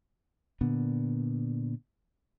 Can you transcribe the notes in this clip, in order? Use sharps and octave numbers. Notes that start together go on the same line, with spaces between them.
A#2 D3 B3